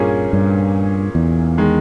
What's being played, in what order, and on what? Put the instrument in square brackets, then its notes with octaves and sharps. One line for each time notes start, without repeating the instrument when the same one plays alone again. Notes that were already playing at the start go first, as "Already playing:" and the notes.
Already playing: [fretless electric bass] G2 [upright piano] A#2 A#3 C#4 G#4
[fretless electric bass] G2
E2
[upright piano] D#3 G#3